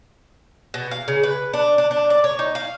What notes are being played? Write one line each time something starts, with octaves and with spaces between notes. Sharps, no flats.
B2
F5
C#3
B4
D4
D4
D4
D5
C#5
D#4
F5